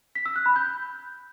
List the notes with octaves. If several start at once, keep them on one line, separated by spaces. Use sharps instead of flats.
B6
E6
F#6
B5
G6